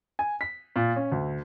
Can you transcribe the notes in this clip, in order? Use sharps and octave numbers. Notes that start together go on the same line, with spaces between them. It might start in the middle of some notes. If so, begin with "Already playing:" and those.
G#5
B6
A#2
C#4
D2